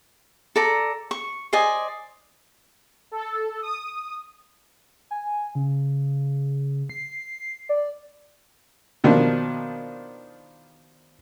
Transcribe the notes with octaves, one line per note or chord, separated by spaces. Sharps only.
A4 D5 A#5
C#6
C5 D5 D#5 G#5
A4
D#6
G#5
C#3
C7
D5
B2 D#3 F3 D4